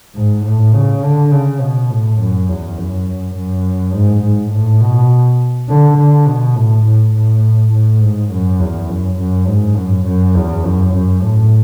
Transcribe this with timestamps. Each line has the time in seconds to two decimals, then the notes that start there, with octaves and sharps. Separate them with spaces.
0.15 G#2
0.45 A2
0.74 C#3
1.03 D3
1.31 C#3
1.61 B2
1.90 A2
2.20 F#2
2.49 E2
2.78 F#2
3.35 F#2
3.94 G#2
4.23 G#2
4.52 A2
4.81 B2
5.69 D3
5.97 D3
6.27 B2
6.55 A2
6.86 A2
7.14 A2
7.73 A2
8.02 G#2
8.31 F#2
8.59 E2
8.89 F#2
9.18 F#2
9.47 G#2
9.76 F#2
10.06 F#2
10.35 E2
10.64 F#2
10.93 F#2
11.22 A2